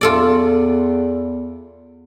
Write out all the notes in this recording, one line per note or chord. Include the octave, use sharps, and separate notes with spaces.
E2 F4 A4 D5